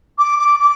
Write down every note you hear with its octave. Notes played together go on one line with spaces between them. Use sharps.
D6
D6
D6